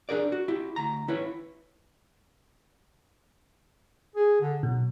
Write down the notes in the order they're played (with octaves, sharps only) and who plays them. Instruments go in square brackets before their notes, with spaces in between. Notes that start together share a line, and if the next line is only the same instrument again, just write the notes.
[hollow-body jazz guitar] D4 G#4 A#4 D5
F#4
E4 G4
D2 A#5
E4 B4 C#5
[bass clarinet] G#4
D3
[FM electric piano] B2 [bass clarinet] F#3